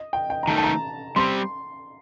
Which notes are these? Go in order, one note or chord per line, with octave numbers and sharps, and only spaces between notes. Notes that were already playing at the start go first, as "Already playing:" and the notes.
Already playing: D#5
G5
G5
A#5
D#3 A3 D#4 A5
A5
A#5
G3 C4 G4 C6